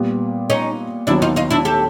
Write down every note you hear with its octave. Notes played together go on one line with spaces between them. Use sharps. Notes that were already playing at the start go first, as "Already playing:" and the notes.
Already playing: A#2 G3 B3
C#4 D#4
D#2 D#3 F#3 B3 D4 E4
D#4 F4
D#4 F4
D4 E4
G4 A4